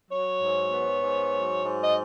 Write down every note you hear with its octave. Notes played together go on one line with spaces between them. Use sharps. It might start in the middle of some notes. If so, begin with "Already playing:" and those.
F#3 C#5
G#2
B3
G#2
F#3
G#2
D#5